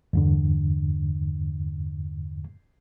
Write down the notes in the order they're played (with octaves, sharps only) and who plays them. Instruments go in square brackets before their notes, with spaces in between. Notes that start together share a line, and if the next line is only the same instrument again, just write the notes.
[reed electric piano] E2 G2 D3